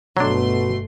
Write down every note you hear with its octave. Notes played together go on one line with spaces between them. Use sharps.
G1 B2 F#3 A3 D4 C6